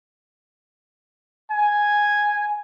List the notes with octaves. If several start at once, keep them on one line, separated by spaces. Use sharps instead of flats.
G#5